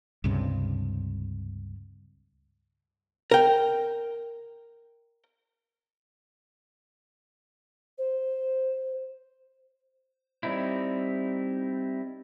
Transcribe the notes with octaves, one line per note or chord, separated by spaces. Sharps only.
C#2 G2 C3
A#4 G5
C5
G3 C4 D#4 E4